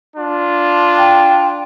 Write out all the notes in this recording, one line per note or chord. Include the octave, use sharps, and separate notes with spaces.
D4 F4
G5